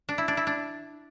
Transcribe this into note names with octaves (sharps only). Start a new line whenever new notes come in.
D4
E4
D4
E4
D4